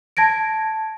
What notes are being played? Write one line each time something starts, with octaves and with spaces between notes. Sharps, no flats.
A5 G#6 A#6 D7